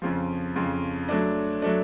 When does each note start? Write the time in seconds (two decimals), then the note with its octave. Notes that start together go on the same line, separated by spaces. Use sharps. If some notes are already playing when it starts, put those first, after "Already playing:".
0.02 F2 C#3 F3
0.56 F2 C#3 F3
1.09 F#3 A3 D4
1.62 F#3 A3 D4